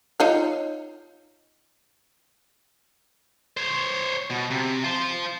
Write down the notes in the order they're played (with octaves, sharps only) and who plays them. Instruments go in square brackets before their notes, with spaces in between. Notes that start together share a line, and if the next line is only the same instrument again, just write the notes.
[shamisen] D#4 F4 C#5
[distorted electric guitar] C5 C#5
B2
C3
F4 C5